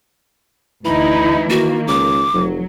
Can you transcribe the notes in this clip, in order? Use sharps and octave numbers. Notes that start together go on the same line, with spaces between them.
D2 E3 D#4 E4 B5
D#3 A#3 F#4
C#2 D6
F1 F#3